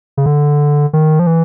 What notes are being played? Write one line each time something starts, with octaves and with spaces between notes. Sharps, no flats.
C#3
D3
D#3
F3
E3